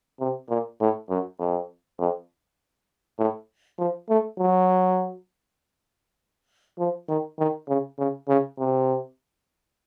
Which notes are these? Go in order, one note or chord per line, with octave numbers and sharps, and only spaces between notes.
C3
A#2
A2
F#2
F2
F2
A2
F3
A3
F#3
F3
D#3
D#3
C#3
C#3
C#3
C3